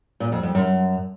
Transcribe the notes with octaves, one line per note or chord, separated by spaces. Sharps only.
A#2
F2
F2
F#2